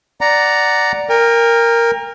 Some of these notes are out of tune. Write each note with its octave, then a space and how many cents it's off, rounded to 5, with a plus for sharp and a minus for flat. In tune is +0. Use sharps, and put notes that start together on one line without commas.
D5 +0 F#5 +5 A#5 +0
A#4 +0 G5 +40